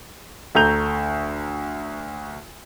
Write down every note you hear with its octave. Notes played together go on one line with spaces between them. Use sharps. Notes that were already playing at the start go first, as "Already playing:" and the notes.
D2 A3 A#5 G6 F7